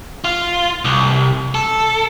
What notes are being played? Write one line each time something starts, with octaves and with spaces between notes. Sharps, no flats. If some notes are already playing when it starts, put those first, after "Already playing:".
F4
C2
A4